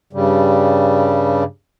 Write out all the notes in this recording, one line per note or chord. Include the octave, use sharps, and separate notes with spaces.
G2 C#3 G3